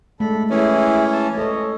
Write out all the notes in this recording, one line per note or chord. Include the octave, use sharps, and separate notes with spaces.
G#3 A3 D4 A4 B5
E3 C#4 E4 G#4
A5
A4 C#5 D#5